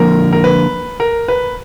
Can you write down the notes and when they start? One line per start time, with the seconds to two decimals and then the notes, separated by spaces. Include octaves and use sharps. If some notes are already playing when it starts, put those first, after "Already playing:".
Already playing: D3 F3 A#3 A#4
0.33 A#4
0.44 B4
1.00 A#4
1.28 B4